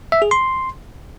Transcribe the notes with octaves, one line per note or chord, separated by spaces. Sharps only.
E5
G#4
C6